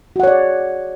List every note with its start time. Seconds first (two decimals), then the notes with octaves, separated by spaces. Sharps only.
0.16 F#4
0.20 F#5
0.23 C#5
0.27 D5
0.31 G#4